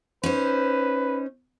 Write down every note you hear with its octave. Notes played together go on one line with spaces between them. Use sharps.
C#4 D#4 B4 C5